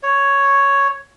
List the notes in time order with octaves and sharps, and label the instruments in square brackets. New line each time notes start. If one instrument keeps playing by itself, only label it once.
[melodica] C#5